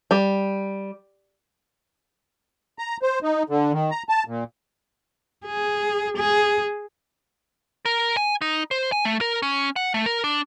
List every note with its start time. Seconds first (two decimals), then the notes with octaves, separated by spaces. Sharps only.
0.11 G3
2.79 A#5
3.02 C5
3.23 D#4
3.49 D3
3.73 D#3
3.91 A#5
4.09 A5
4.27 A#2
5.45 G#4
6.17 G#4
7.86 A#4
8.17 G#5
8.42 D#4
8.71 C5
8.92 G#5
9.05 A3
9.21 A#4
9.43 C#4
9.76 F#5
9.94 A3
10.06 A#4
10.24 D4